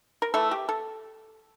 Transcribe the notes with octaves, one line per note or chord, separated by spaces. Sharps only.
A#4
E3 A3 A4
G4
A4